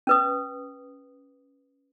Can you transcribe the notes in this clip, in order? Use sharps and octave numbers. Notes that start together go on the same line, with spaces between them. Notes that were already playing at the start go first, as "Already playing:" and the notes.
C#4 B4 D#6